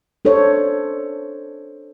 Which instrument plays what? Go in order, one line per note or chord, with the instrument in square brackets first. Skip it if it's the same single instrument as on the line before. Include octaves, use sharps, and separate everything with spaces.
[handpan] D4 A4 C5 C#5